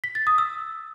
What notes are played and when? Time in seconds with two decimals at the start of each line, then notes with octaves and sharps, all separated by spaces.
0.04 B6
0.15 A6
0.27 D#6
0.38 E6